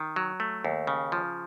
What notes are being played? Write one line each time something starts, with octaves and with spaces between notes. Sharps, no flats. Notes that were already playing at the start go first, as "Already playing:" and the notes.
Already playing: D#3
F#3
A3
D#2
C#3
F3